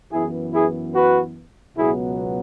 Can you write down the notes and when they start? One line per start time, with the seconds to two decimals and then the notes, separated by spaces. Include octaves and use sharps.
0.12 F#2 E3 B3 E4 G#4
0.53 E4 G#4
0.94 F#4 B4
1.77 C#2 B2 F#3 B3 E4 G#4